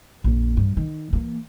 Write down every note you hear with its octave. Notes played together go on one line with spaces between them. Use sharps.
A#1 F2
G2
D#3
E3 A#3